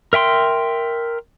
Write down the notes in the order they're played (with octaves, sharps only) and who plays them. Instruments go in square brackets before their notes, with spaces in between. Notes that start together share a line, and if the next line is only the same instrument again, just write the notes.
[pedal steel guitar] A#4 E5 G5 C6